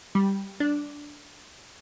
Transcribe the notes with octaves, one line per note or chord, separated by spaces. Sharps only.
G3
D4